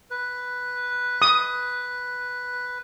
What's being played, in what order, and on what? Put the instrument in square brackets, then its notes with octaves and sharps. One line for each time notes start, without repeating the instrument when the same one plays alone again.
[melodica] B4
[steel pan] D#6